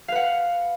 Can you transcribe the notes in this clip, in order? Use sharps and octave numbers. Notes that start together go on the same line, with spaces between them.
B4 F5 F#5